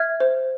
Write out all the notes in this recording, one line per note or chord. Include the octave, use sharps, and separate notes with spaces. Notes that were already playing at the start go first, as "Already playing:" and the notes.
Already playing: E5 F6 G#6
C5